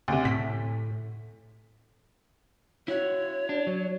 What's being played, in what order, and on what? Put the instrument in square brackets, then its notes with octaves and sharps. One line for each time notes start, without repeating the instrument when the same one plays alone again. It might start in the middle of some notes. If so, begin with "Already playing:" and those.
[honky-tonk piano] D2 C3
[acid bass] A2 [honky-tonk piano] B6
[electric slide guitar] E4 F#4 [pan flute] C#5
[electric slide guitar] D4
F#3